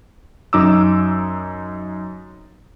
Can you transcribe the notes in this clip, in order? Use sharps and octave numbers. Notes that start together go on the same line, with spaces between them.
F#2 D#4 D6 E6